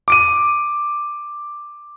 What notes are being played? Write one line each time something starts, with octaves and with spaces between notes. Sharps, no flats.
D6 D7 D#7